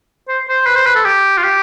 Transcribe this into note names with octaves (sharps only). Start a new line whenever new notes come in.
C5
C5
B4
C5
B4
A4
G4
F4
G4